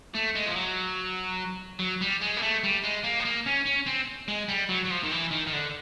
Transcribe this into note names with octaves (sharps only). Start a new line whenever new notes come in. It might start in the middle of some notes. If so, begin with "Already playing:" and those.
A3
G#3
F3
F#3
F#3
G3
G#3
A#3
A3
G3
G#3
A#3
B3
A#3
C#4
C#4
C4
G#3
G3
F#3
F#3
F3
D#3
E3
D#3
D#3
D3